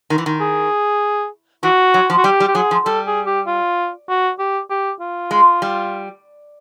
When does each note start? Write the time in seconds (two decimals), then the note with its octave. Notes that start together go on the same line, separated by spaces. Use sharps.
0.10 D#3
0.18 E3
0.26 D#3
0.40 G#4
1.63 E3 F#4
1.94 F#3
2.10 F3
2.18 F#4
2.24 G3 G4
2.40 G3
2.48 G4
2.55 F#3 G#4
2.71 F3
2.85 G3 A4
3.07 G#4
3.26 G4
3.47 F4
4.09 F#4
4.39 G4
4.70 G4
5.01 F4
5.31 G#3
5.62 G3